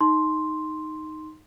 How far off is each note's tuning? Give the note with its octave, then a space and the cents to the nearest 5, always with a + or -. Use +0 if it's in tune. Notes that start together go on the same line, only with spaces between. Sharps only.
D#4 +0 C6 +0